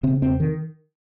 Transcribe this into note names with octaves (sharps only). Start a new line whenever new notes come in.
C#3 C4
E2 C4
D#3